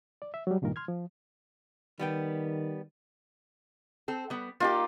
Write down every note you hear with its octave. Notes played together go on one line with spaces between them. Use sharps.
D5
E5
F#3 G3
C#2 G2 A#2 D#3 A#4
C6 F6 G#6
F3
D#3 G3 B3 G5
C4 A4
G3 B3
A#3 D#4 F4 G4 D6